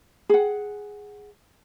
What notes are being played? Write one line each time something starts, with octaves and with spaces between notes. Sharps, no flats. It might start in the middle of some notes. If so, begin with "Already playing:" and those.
G#4 F#5